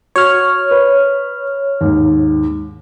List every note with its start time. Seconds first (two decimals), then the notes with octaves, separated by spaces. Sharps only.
0.16 F#4 C#5 F6
0.71 B4
1.81 D#2 G#2